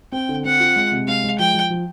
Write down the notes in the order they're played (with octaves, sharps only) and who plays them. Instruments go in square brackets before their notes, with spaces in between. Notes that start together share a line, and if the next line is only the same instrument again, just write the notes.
[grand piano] C4 [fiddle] G5
[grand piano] D3
[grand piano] C4 [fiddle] F#5
[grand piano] F4
G#3
C3
[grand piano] G#3 [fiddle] F5
[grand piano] G#3
[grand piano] F3 [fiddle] G5
[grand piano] F3
F3